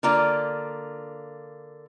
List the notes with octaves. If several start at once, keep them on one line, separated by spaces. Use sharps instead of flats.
D3 A#3 F4 D5